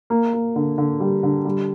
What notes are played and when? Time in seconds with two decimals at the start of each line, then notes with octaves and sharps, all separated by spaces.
0.10 A#3
0.33 A#3
0.56 D3
0.78 D3
1.00 G3
1.23 D3
1.45 G3